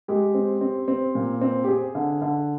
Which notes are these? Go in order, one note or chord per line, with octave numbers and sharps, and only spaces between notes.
G#3 G4
C4
C4
C4
A#2
C4
G4
C4 G#4
D3
D3